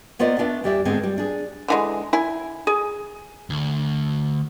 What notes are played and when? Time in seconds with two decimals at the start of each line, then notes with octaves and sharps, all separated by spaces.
0.19 A#3 B3 F4 C5 D5 D#5
0.38 A3 B3 D4 F4
0.64 E2 G3 G4 D5 E5
0.85 G#2 D3 G#3 B3 C4
1.03 G3
1.18 D4 G#4
1.68 D3 E3 G#3
2.13 E4 G#5
2.67 G#4
3.50 D2